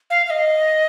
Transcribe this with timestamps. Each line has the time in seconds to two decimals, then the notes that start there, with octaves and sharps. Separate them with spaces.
0.10 F5
0.27 F5
0.30 D#5